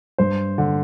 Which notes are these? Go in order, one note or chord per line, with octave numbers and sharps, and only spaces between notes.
G2 C5
D3